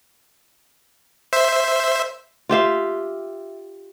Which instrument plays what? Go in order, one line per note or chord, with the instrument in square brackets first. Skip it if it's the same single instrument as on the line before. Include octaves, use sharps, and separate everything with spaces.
[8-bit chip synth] C5 E5
[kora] F4 G4 E5 F5